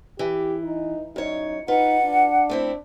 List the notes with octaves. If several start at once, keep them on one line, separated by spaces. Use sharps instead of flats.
E3 G4
D#4
F#2 D#4 C#5
D#4 F4 B4 F#5
D4
A3 C4 E4